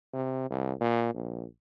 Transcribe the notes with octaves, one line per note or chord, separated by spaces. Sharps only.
C3
C2
A#2
A#1